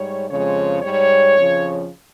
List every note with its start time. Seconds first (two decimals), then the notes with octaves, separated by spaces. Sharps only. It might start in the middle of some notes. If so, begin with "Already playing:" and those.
Already playing: G#2 G3 C#5
0.29 F2 C#3 F3 G#3 C#5
0.82 G#2 G3 C#5
1.36 F2 C#3 F3